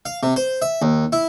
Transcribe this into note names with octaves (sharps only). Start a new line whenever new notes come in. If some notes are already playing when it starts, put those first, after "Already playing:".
F5
C3
C5
E5
D#2
E4